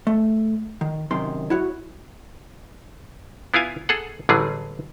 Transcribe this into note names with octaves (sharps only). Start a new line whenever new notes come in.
A3
D#3
F#2 C3 D#3 C6
E4 F#4 C#5
B3 E4 F4 F5 G#5
G#4 A4 F#5
A1 D3 F#3 G3 G#4